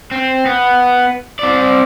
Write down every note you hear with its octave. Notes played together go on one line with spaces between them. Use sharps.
C4
B3
C4 D5